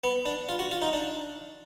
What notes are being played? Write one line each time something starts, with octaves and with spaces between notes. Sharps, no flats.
B3
D4
F4
F#4
F4
D#4
D4